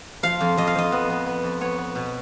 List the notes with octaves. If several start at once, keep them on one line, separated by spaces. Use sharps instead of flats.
F3 F5
F2
F2 D#5
F5
F2 D#5
B3
B3
B3
F2
B3 C#5
B3
B2